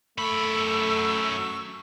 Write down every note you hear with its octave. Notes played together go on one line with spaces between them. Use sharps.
F#2 A3 B5 C#6 E6